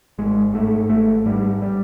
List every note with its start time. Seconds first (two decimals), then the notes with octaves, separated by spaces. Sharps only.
0.18 G#1 G#3
0.54 G#2 A3
0.89 G#1 A3
1.26 G#2 G3
1.62 G3